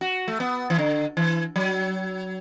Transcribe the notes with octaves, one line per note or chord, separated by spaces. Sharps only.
F#4
A3
B3
E3
D3
E3
F#3